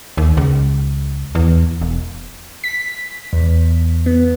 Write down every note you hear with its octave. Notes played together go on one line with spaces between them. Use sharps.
D#2
C#2
E2
E1
B6
E2
B3